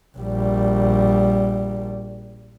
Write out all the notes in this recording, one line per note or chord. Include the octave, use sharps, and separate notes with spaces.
A#1 G3